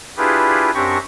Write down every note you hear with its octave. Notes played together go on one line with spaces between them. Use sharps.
D4 E4 F4 G4 G#4 B4
F#2 C4 D4 G4 C#6 A#6